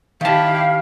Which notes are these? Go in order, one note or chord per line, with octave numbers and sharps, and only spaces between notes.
D#3 E4 G4 F5 A5